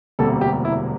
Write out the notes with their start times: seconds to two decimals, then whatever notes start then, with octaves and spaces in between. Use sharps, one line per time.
0.19 E1 D2 C3 G3 A#3 A4
0.41 G4
0.65 E4